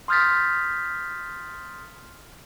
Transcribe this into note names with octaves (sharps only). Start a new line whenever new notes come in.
C6 D#6 F6 G6 A6 B6